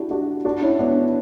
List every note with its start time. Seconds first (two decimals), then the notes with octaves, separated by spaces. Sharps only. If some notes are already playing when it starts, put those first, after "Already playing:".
Already playing: D4 E4 F#4 G4
0.10 D4 F#4
0.45 D4 F#4
0.62 C#4 E4
0.79 B3 D4